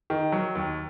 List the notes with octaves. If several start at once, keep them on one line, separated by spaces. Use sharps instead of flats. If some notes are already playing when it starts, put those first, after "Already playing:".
D#3
F#3
D#2